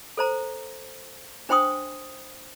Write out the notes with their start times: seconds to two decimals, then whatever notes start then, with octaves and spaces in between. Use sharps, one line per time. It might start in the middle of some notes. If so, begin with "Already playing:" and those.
0.17 A4 C5 A#5
1.49 D4 C5 G5 C6 D#6